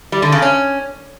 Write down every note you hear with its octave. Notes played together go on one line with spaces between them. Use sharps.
G3
D3
C#3
C#4